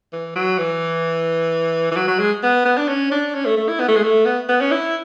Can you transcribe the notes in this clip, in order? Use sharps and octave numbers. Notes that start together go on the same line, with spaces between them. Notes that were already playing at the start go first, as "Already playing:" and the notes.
E3
F#3
E3
E3
F#3
F#3
G#3
B3
B3
D4
C#4
D4
C#4
A3
A3
E4
B3
A3
G#3
A3
B3
B3
C#4
E4